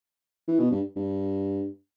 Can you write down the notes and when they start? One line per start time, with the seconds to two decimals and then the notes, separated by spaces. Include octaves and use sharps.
0.48 E3
0.59 B2
0.71 G2
0.96 G2